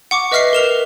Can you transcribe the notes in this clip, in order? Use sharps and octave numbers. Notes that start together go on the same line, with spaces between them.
F#5 C#6 D6
B4 D#5 E5 F6 B6 C7
A#4 E7 F7